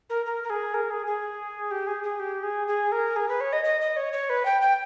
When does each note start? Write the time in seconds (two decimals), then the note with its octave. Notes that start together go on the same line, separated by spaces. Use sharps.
0.10 A#4
0.26 A#4
0.44 A#4
0.50 G#4
0.74 A#4
0.90 G#4
1.07 G#4
1.71 G4
1.87 G#4
2.03 G#4
2.19 G4
2.43 G#4
2.68 G#4
2.92 A#4
3.16 G#4
3.28 B4
3.41 C#5
3.53 D#5
3.64 D#5
3.81 D#5
3.96 C#5
4.13 C#5
4.30 B4
4.45 G5
4.62 G5